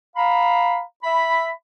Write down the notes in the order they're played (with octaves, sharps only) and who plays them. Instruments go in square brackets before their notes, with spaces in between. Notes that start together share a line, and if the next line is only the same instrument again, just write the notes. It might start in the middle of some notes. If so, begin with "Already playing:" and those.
[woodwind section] F5 A#5 B5
E5 B5